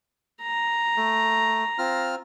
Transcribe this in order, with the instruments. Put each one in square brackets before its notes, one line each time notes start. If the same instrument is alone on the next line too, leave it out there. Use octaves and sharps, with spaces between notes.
[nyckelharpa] A#5
[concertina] A3
C4 F4 F6